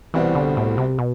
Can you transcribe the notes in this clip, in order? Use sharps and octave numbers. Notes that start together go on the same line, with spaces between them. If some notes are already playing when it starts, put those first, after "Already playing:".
C2 B2 E3 G3 C4 F#4
D3
A2
C3
B2